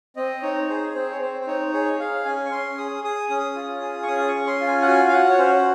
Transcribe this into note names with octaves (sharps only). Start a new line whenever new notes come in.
C4 D#5
D#4 C#5
G#4 C5
C4 C5
C#5
C4 C5
C5
D#4 C#5
G#4 C#5
G#4 F5
C#4 G#5
C#6
C#4 C6
G#4 D#6
G#4 D#6
C#4 D#6
F4
G#4
C#6
C#4 D#6
C#6
C#4
C6
F4
G#5
F#5
F#4 G#5
F5
F#4 F#5
C#5
C#4 C5